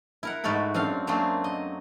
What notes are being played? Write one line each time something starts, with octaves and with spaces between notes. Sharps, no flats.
E4 A#4 F#5
G#2 A3 F#4 A4 B5
F#2 C4 D4 F5
F#3 A3 A#3 C4 D4 G#4
D#5